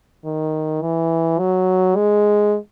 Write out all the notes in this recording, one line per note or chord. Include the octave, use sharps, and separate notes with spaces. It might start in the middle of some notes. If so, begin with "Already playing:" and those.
D#3
E3
F#3
G#3